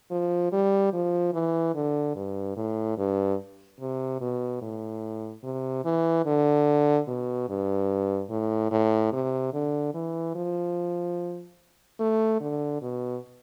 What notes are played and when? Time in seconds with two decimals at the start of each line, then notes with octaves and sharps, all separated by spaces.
0.11 F3
0.52 G3
0.93 F3
1.34 E3
1.75 D3
2.15 G2
2.56 A2
2.98 G2
3.80 C3
4.21 B2
4.61 A2
5.44 C3
5.84 E3
6.26 D3
7.07 B2
7.49 G2
8.30 A2
8.71 A2
9.12 C3
9.53 D3
9.94 E3
10.35 F3
12.00 A3
12.41 D3
12.82 B2